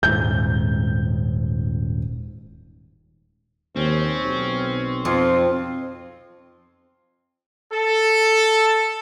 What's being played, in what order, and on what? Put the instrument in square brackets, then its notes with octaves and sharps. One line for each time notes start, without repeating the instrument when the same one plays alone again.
[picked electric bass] D#1 G#2 [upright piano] G6
[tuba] D#2 [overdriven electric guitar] C4 [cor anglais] C#4
[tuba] B1
[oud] F2 [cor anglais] F4
[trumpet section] A4